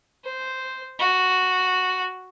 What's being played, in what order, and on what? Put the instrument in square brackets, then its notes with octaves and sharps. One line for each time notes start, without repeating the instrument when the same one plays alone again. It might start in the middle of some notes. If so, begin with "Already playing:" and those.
[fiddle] C5
F#4